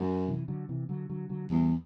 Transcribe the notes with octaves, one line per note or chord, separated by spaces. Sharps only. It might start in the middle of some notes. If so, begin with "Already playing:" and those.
Already playing: F#2
C3 E3
D3 F#3
C3 E3
D3 F#3
D3 F#3
D3 F#3
E2 E3 G3